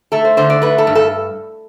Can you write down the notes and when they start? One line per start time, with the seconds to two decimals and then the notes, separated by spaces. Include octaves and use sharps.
0.12 A3 A4
0.25 C5
0.37 D3 C5
0.50 D5
0.62 A3 B4
0.78 A4
0.87 G2
0.95 A4